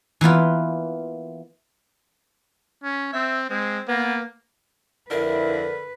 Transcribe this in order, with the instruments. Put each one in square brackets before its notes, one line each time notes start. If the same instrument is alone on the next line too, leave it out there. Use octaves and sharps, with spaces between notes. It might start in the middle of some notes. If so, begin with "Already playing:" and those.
[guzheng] E3 A#3 B3 F4
[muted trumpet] C#4
[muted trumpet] C4 [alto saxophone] E5
[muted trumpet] G#3 [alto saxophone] C4
[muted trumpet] A#3 [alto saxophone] B3
[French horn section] F2 E4 [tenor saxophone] D3 [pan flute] A#4 [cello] B4